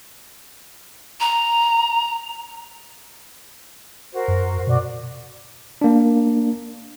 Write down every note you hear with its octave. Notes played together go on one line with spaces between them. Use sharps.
A#5
F#4 A#4 C5
F#2
B2 F#4 D5
A#3 D4